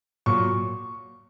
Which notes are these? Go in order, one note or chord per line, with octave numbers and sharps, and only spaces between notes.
A#2 F#3 C#6